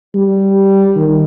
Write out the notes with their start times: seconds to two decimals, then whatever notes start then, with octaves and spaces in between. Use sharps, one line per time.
0.15 G3
0.96 D#3